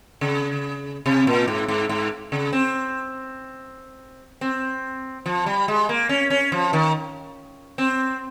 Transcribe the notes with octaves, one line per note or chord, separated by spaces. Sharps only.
C#3
C3
A#2
G#2
G#2
G#2
C#3
C4
C4
F3
G3
G#3
A#3
C#4
C#4
F3
D#3
C4